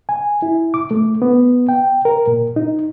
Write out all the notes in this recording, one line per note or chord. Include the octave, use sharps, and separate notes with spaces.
G#5
E4
D6
A3
B3
G5
A#4
A#2
D#4